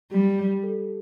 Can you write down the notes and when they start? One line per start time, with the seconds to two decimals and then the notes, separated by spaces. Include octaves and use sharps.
0.11 G3 G4
0.63 A4